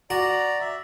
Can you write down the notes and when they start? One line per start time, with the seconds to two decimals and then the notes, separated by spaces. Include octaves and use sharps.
0.10 F#4 D5 A#5
0.60 E5